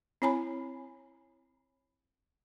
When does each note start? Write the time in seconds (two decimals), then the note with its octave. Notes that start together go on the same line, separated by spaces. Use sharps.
0.22 C4 E4 C#5 G#5 A#5 B5